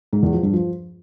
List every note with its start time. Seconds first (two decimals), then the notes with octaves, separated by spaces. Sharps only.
0.13 G#2
0.23 E2
0.33 F3
0.43 G2
0.53 F3